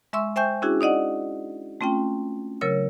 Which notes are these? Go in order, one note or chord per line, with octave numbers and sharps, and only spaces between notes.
G#3 E5 C6 C#6 E6
C5 E5 G5 G#5 C#6 G6
C#4 D4 E4 F#4 G#4
D#4 D5 D#5 F#5
A3 C4 C#4 F4 G5
C#3 F#3 A#4 C#5 E6